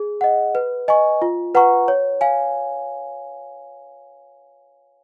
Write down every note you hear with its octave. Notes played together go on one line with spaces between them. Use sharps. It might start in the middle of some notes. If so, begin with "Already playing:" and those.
Already playing: G#4
D#5 F#5
B4
D#5 G#5 C#6
F4
B4 F#5 A#5 C#6
C#5
F5 G#5